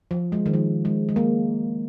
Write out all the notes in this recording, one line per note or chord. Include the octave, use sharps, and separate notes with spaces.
F3
G#3
D#3
F3
G#3
G#3
A#3